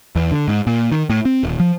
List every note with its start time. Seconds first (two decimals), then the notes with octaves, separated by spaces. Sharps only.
0.16 E2
0.32 D3
0.48 G#2
0.67 A#2
0.92 D#3
1.10 A2
1.25 C4
1.43 D#1
1.60 F3